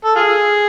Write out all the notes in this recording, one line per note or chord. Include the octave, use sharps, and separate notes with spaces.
A4
F4 G#4